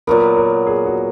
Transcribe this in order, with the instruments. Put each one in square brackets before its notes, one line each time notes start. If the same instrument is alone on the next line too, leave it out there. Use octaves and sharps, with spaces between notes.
[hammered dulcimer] A#2 F#3 B3 [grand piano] A#4
[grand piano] A#4
G#4
F#4